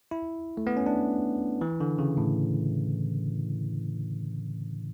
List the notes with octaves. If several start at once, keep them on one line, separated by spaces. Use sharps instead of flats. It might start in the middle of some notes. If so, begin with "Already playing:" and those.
E4
A3
B3
C#4
D4
E3
D3
C#3
A2